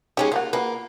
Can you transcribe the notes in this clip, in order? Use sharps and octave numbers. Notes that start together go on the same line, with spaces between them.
G#3 C#4 D#4 G4 G#5
G3 A#3 F4 F#4
A#3 F4 F#4 B4